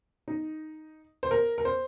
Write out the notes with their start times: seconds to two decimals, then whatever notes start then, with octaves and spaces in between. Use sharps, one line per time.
0.28 D#4
1.23 C5
1.31 A#4
1.58 A#4
1.65 C5